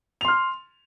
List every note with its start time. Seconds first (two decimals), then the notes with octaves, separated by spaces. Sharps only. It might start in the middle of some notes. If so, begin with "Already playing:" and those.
0.21 F7
0.25 C6
0.28 F6